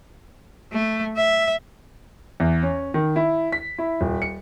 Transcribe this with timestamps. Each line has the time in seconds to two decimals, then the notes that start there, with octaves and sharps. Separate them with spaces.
0.72 A3
1.16 E5
2.40 E2
2.63 C#4
2.94 D#3
3.16 E4
3.52 B6
3.78 E4
4.01 D#1
4.22 C#7